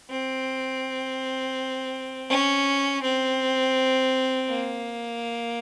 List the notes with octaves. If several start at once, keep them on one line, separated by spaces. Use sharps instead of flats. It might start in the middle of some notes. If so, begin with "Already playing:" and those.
C4
C#4
C4
A#3